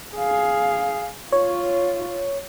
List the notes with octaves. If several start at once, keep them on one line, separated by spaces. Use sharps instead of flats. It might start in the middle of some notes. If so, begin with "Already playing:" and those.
G#4 F5
F4 C#5